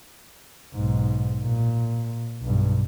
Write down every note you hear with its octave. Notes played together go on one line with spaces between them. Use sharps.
B1 G#2
A#2
B1 G2